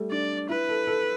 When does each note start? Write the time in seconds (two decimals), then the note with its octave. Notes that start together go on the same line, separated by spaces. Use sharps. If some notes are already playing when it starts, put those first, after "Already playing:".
Already playing: G3 A3
0.11 D4 D5
0.49 E4 B4
0.69 A4
0.87 A4